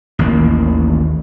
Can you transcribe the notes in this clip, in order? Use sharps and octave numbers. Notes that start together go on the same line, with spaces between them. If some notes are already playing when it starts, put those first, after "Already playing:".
A1 D#2 D#3 A#3